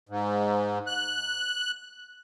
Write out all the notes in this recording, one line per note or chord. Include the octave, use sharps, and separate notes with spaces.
G#2
F#6